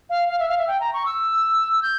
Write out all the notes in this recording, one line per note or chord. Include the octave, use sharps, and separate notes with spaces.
F5
F5
E5
F5
E5
G5
A#5
C#6
E6
G6